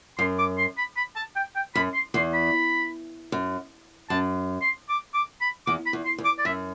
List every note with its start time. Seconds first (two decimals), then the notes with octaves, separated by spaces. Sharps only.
0.18 F#2 C6
0.39 D6
0.58 C6
0.78 B5
0.97 B5
1.16 A5
1.36 G5
1.56 G5
1.75 F#2 B5
1.94 C6
2.14 E2 C6
2.34 B5
3.32 F#2
4.09 F#2 A5
4.62 C6
4.89 D6
5.14 D6
5.41 B5
5.67 E2 D6
5.86 B5
5.93 E2
6.05 C6
6.18 E2
6.25 D6
6.38 D5
6.45 F#2 E5